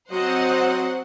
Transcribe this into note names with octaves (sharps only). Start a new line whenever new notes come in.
F#3 C4 C5 C#5 D#5 F#5